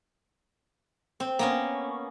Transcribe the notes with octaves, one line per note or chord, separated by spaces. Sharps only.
C4
A#3 B3 C#4